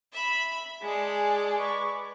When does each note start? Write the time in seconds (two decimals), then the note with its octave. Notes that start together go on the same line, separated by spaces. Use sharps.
0.13 E5 B5
0.82 G#3 G#4 D5 A5
1.58 B4 C#6 D6